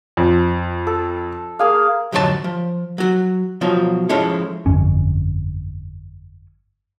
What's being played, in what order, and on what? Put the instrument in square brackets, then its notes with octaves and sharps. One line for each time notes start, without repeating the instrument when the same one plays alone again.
[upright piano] F2
[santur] A4
A#3 G#4 F5
[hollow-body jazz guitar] F2 G#2 D3 F#3 F4 A5
F3
F#3 F#4
B2 F3 F#3 F4
F3 G#3 C#4 E4 A4
[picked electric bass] G1 F2 C#4